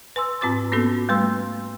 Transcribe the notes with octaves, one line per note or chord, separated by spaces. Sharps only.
B4 G#5 C6 E6
G#2 C4 F4 B4 D6 A6
A#3 B3 C#4 F#4 A4
G3 A3 B4 C6 E6